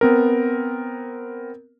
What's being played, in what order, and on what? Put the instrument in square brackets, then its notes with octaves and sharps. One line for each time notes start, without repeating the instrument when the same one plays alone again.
[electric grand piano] B3 C4 A#4